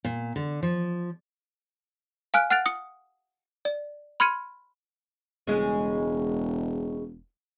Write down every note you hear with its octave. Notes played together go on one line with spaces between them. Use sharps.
A#2
D3
F3
F5 G#5 F6 F#6 D7
F#5 F6 F#6 A6 D7 F7
D#6 C#7
D5
B5 C6 F6 G#6 C#7 D#7
E1 C#3 G#3